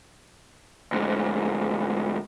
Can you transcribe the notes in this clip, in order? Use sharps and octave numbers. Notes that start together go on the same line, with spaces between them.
D2 G#2